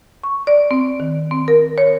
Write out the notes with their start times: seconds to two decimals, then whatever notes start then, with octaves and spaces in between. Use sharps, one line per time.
0.23 C#6
0.47 D5
0.71 C4
1.00 D#3
1.31 C4
1.48 A#4
1.78 C#5